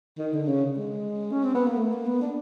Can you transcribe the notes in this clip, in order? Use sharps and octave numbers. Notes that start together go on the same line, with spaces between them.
D#3
D3
C#3
G#3
C#4
C4
B3
A#3
A3
A#3
B3
D4